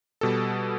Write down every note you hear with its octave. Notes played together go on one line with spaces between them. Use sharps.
B2 G3 A4